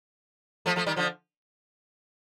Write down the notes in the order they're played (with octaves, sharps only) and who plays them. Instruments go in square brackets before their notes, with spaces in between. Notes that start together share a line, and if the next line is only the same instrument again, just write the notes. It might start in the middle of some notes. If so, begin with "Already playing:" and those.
[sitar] F3 A3
F3 A3
D#3 G3
D3 F3